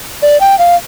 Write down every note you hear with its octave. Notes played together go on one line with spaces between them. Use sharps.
D5
G5
F5